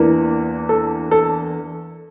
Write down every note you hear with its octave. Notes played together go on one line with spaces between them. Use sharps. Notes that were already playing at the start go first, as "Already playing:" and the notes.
Already playing: E2 E3 A#3 D4
A4
A4